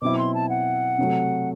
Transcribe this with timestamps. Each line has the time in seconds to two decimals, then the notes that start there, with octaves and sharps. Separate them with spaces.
0.02 B2 F#3 C4 E4 D6
0.18 C6
0.34 A5
0.49 F#5
0.98 C3 F#3 A3